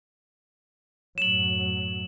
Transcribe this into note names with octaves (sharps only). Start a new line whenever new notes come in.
F#2 A2 F#3 E7 F#7